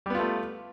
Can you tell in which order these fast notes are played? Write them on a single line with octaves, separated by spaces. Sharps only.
G3 B3 F4 A3